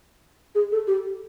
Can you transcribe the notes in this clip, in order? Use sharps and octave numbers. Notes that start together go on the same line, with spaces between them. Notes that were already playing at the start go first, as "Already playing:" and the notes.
G#4
A4
G4